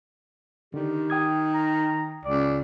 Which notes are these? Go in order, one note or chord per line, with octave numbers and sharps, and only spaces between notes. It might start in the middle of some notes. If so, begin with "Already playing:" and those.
D3 D#3 G4
G5 D#6 G#6
A#5
C#2 D5